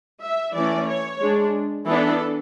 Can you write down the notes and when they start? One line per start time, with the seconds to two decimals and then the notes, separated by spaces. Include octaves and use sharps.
0.22 E5
0.55 E3 A3 C#4 D5
0.88 C#5
1.21 G#3 D4
1.87 E3 B3 D4 A4